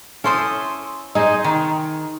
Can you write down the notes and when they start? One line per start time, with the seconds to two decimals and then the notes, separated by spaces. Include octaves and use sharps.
0.24 C#4 E4 A4 C5 C6 D#6
1.15 D#4 G#4 C5 D#5
1.44 D#3